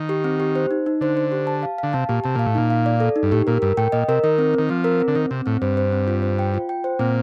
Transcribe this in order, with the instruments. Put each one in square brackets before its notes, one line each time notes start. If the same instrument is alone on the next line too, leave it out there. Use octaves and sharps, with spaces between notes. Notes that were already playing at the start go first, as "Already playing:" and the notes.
Already playing: [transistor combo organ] D#3
[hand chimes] G4
C4
G4
C5
D#4
D#4
[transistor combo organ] D3 [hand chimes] C5
[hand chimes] C5
G4
A5
F5
[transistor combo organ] D3 [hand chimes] F5
[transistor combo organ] C3 [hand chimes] A5
[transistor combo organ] A#2 [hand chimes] G4
[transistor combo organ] C3 [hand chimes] A5
[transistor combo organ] A#2 [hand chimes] F5
[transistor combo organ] A2
[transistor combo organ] A#2 [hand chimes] D#4
[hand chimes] F5
D5
A4
D#4
[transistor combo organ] G2
[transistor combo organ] A2 [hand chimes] G4
[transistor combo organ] A#2 [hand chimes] A#4
[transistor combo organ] G2 [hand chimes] A#4
[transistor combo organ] A2 [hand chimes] G5
[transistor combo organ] A#2 [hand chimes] D#5
[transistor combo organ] C3 [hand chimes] A#4
[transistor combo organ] D#3 [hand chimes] A#4
[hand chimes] C4
[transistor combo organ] D#3 [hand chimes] C4
[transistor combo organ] F3 [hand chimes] C4
[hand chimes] A#4
C4
[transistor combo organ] D3
[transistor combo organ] D#3 [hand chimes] C4
[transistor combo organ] C3 [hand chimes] C4
[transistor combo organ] A2 [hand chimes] C4
[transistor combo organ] G2 [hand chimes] C5
[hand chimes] C5
C4
F4
C5
G5
F4
G5
C5
[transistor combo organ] A#2 [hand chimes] C4